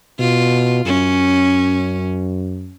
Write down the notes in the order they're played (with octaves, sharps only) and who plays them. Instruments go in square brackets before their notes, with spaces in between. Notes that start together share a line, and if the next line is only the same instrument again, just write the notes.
[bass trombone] B2 [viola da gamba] F4
[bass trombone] F#2 [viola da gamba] C#4